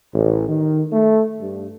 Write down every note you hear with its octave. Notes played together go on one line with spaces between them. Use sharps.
A1
D#3
A3
G2